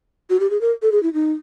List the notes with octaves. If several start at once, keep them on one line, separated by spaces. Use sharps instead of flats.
F#4
G4
G#4
A#4
A4
G#4
E4
D#4